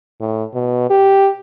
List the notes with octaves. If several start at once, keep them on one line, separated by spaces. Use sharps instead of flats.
A2
B2
G4